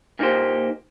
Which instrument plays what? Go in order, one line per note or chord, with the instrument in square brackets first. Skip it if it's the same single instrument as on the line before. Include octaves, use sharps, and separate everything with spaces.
[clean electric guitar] A#2 A#3 D#4 G4 C5